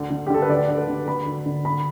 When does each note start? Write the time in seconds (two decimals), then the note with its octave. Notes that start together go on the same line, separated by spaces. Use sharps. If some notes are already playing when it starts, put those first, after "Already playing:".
Already playing: D2 D3
0.11 D3
0.27 G4
0.30 D3 A4
0.42 B4
0.49 D2 D5
0.69 D2
0.78 B4
0.88 D3
1.07 D3 B5
1.26 D2
1.46 D3
1.65 D3 B5